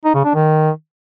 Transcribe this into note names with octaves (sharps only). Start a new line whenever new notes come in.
D#4
C#3
D4
D#3